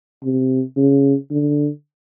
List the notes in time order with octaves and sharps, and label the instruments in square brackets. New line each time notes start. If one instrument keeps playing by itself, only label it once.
[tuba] C3
C#3
D3